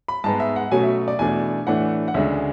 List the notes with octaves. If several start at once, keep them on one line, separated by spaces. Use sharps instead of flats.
B5
G#2 G#3 B3 A5
E5
F#5
B2 F#3 A3 C#4 G#5
E5
D5
E2 B2 A3 D4 G#5
A2 E3 A3 D4 F#5
F#5
D2 C#3 G#3 D4 E5